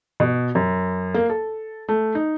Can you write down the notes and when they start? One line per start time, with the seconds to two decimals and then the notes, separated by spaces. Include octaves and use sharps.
0.20 B2
0.55 F#2
1.14 A#3
1.30 A4
1.89 A3
2.15 D#4